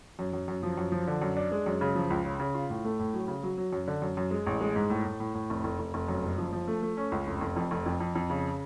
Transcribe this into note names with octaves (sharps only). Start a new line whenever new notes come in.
F#2
F#2
F#2
F3
F#2
F3
D3
F#2
D4
G#3
F#2
C#3
F3
C#2
C#3
C#3
F4
A2
A3
A2
F#3
C#3
F#3
F#3
F#2
D3
F#2
F#2
G#3
A1
G#3
G#2
A2
A2
A2
A2
F1
F1
F1
F1
F#2
F#1
F3
F3
A3
A3
C#4
C#2
F1
F1
F2
F1
F2
F2
F2
C#3